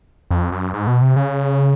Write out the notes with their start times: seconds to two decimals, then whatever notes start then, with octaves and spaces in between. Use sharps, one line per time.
0.31 F2
0.52 F#2
0.74 G#2
0.87 B2
1.02 C3
1.16 C#3